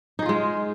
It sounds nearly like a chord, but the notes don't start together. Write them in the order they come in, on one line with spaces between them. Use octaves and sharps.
D#4 G#4 F4 G#3